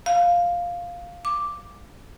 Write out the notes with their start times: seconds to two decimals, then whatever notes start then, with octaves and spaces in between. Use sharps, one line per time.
0.06 F5
1.25 D6